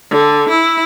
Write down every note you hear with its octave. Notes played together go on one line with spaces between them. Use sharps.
D3
E4